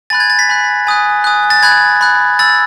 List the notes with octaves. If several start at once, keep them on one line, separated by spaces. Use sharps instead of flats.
G#5 B5 F#6 A6
G#6
A6
B6
G#5 B5 F#6
G#5 D#6 F#6
G#5 D#6 F#6
A6
B5 F#6 G#6
B5 F#6
B5 E6 A6